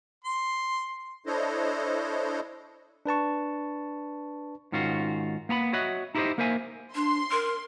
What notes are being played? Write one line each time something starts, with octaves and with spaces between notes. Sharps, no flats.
C6
D4 E4 A4 C5 C#5 D#5
D4 B4 A5 C#6
G#2 D#3 C#4 F4 F#4
A#3 B3 A#5 B5
F#4 C#5 D#5 E5 F#5
D#4 E4 G4 A#4 C5 D#5
A#3 A#4 C5 E5 G#5
D4 C6
A#4